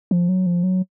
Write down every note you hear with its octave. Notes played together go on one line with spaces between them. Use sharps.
F3
F#3
F3
F#3